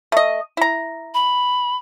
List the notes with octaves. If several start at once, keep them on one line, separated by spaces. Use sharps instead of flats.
A3 D#5
E4 A#5
B5